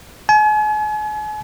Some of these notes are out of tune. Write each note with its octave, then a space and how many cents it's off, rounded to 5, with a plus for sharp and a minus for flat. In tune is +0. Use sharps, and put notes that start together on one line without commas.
G#5 +40